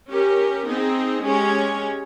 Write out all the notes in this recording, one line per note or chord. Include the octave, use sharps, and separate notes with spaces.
C#4 G4 A#4
C4 D#4 G#4
G#3 C#4 G4 C#5